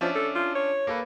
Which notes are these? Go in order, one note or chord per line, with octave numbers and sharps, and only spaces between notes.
F3 C#4 D4 E5
A4
F4
C#5
A#3 A4 B4